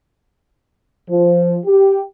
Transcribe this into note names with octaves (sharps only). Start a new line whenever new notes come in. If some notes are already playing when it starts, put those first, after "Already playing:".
F3
G4